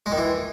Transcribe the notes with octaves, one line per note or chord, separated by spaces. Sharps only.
G#3
D#3
E3